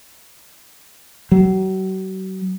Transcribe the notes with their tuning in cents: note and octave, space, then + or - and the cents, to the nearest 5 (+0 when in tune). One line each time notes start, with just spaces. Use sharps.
F#3 +35